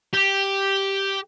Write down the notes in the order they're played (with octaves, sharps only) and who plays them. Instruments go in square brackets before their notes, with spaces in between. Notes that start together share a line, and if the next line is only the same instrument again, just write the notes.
[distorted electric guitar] G4